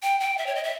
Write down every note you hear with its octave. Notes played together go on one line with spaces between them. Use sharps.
G5
G5
E5
C#5
D#5
E5